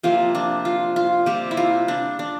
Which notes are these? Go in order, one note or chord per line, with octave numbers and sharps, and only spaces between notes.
C3 F3 A#3 F4
D4
F4
F4
C3 G3 A#3 G4
E4
F4
D4
D4